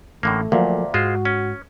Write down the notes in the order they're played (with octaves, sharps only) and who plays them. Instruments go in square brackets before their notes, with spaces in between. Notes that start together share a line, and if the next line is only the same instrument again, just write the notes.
[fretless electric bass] A1 [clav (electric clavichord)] A2 D3 A#3 [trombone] A3
[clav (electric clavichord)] D2 A#2 [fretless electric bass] F3 F#3 A#3
[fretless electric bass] G#2 [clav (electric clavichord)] G#3 F4 C5 [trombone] F#4
[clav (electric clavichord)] C#4